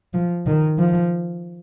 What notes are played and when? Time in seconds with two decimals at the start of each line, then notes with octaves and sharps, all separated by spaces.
0.14 F3
0.46 D#3
0.78 F3